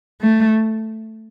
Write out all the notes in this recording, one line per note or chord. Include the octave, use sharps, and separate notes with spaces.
A3